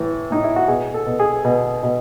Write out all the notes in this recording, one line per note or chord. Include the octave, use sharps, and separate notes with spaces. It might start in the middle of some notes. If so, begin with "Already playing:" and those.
Already playing: A2 E3
A2 D#4
E4
F#4
B2 G#4
A4
B2
G#4
B2
B2